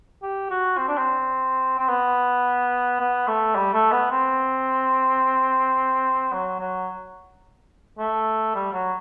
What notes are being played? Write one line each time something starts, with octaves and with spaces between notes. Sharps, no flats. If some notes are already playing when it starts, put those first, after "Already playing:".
G4
F#4
C4
D4
C4
C4
B3
B3
A3
G3
A3
B3
C4
F#3
F#3
A3
G3
F#3